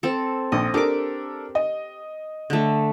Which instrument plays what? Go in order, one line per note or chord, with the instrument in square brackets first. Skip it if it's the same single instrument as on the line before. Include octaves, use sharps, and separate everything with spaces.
[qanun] C4 A4
[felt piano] A#1 [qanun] D#5
[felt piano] D4 A4 A#4 [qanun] G4 D6
[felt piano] D#5
[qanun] D3 A3